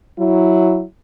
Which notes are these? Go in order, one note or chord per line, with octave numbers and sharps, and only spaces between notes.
F#3 E4